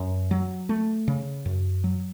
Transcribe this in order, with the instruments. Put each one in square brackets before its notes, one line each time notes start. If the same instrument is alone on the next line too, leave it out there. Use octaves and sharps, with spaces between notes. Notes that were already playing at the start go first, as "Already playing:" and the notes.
Already playing: [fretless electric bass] F#2
F#3
A3
C#3
F#2
F#3